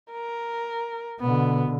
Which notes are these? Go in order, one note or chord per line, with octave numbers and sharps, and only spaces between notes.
A#4
B2 D3 B3